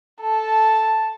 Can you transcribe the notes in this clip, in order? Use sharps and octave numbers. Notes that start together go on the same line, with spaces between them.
A4 A5